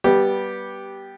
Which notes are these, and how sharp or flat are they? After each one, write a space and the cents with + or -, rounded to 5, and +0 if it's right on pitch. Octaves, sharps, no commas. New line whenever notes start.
G3 -10 B3 -15 G4 +0